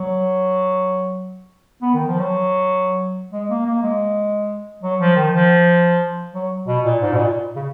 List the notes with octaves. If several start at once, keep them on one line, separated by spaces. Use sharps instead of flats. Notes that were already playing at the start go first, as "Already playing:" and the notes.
Already playing: F#3
B3
D#3
F3
F#3
G#3
A#3
A#3
G#3
F#3
F3
D#3
F3
F#3
B2
A#2
G#2
B2
A#2
C#3